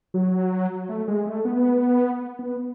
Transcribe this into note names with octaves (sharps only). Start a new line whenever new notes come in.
F#3
A3
G#3
A3
B3
B3